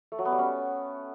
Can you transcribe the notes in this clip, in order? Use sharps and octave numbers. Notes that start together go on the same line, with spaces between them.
A3
F#3
B3
G3
C#4